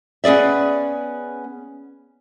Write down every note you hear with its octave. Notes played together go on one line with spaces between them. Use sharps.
B3 C#4 G#4 D5 E5